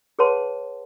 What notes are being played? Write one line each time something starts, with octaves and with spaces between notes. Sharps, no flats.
G#4 B4 C#5 F#5 A5 C6